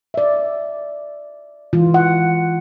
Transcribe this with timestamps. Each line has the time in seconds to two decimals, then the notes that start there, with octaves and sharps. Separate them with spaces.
0.14 D5 E5
1.73 E3 G#3 F4
1.94 F#5